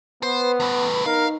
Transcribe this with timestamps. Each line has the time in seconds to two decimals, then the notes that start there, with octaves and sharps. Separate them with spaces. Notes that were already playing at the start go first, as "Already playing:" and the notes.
0.23 B3 B4 C5
0.60 E2 A2
1.06 D#4 A#4 F5